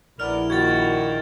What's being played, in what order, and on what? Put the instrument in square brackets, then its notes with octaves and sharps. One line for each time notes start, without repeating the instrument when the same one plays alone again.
[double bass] A#1 E4 [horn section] B3 A#4 D5 [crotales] F6 F7
[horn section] A#2 D#3 [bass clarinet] F#4 [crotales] G#6 A6